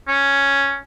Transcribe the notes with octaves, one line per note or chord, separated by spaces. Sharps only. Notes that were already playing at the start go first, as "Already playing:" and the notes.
C#4